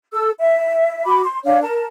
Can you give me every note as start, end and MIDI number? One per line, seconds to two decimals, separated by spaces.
0.13 0.31 69
0.13 0.31 88
0.39 1.05 76
1.06 1.21 66
1.06 1.21 83
1.06 1.21 86
1.24 1.39 84
1.45 1.61 62
1.45 1.61 73
1.45 1.61 77
1.62 1.85 70
1.62 1.85 81